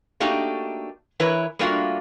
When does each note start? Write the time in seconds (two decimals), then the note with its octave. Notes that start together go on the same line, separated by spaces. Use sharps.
0.20 A3 A#3 D4 D#4 F#4 G4
1.20 E3 E4 A#4 B4 C#5
1.59 G3 A3 A#3 D4 F4 F#4